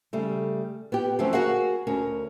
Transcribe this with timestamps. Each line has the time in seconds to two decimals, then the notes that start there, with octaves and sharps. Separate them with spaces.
0.13 C#3 G3 A3
0.92 B3 G4
1.19 D3 F3 F#3 A3 C4 C#4
1.33 F#4 G#4 A#4 F5 F#5
1.87 D2 C#4 A#4